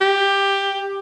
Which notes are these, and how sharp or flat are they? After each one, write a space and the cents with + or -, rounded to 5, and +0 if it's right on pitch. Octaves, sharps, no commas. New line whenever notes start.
G4 +10